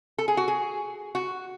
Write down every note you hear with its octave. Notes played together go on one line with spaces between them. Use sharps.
A4
G#4
F#4
G#4
F#4